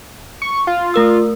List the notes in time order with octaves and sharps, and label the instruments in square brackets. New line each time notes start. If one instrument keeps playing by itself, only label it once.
[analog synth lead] C#6
F4
[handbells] A3 A#4 E6